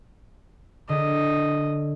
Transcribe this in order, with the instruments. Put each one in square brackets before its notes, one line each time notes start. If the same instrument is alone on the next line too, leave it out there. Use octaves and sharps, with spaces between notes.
[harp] D3 [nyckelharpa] D#5